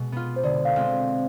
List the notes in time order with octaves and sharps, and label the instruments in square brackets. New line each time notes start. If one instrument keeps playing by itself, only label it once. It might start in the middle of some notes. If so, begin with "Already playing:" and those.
Already playing: [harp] B2 G#3
B3 F4
[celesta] C5
[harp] D3 [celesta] D5
[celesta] F5
[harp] G#3 C4 F4